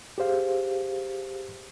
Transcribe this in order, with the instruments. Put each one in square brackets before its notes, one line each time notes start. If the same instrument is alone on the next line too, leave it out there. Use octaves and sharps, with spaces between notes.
[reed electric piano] G4 G#4 C5 F5